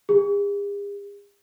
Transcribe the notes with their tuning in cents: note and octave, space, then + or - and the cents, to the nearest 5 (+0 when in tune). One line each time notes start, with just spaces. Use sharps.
G#4 -45